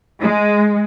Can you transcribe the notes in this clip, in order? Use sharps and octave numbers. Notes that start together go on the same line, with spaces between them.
G#3